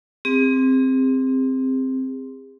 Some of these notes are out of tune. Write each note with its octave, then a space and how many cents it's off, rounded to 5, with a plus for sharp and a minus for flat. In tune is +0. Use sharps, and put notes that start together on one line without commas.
C4 +0 G#4 -40